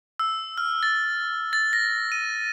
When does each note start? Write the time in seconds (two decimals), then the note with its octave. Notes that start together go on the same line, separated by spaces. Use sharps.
0.19 E6
0.58 F6
0.83 A6
1.53 A6
1.73 A#6
2.12 D#7